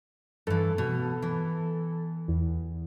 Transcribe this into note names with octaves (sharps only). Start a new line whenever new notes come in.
G2 E3 A4
B2
E3
E2